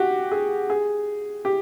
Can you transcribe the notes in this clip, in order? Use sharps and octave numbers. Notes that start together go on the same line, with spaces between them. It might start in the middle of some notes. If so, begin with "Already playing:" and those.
Already playing: F#4 G4
G#4
G#4
G4